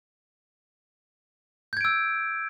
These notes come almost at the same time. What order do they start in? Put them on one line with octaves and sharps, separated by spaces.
G6 G#6 D7 E6